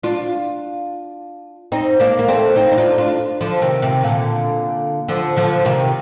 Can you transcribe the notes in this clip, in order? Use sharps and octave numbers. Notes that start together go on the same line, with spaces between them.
D4 F4
C4 D#4
A#3 D4
A#3
A3 C4
C4 D#4
D#4
D4 F4
D4 F4
D3 F3
C3 D#3
C3 D#3
A#2 D3
D3 F3
D3 F3
C3 D#3